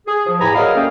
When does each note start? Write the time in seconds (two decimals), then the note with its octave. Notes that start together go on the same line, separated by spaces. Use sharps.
0.07 G#4
0.27 F3
0.40 E2 A2 G4 G#5 A#5 B5
0.55 F#3 G#4 A#4 D5 D#5 F5
0.75 A3 A#3 C#4 A4 F5 G5